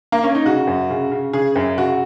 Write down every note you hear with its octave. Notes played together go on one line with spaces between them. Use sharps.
A#3
C#4
D#4
C#3 F#4
F#2
C#3
C#3
C#3 G#4
F#2
C#3 F#4